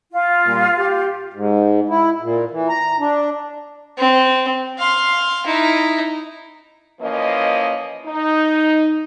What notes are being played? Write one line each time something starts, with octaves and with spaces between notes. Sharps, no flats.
F4
A#2 G3
G4
G#2
E4
A#2
E3
A#5
D4
C4
F5 C6
D#4 E4
E3 F3 A#3 C#4 D#5
D#4